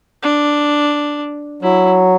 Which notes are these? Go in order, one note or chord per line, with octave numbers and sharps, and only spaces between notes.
D4
F#3 E4